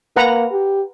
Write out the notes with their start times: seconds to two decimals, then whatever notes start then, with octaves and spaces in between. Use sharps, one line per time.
0.16 A#3 B4 F#5 A#5
0.52 G4